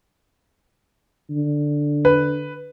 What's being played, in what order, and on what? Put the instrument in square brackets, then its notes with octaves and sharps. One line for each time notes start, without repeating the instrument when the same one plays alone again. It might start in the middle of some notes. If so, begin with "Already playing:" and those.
[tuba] D3
[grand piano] B4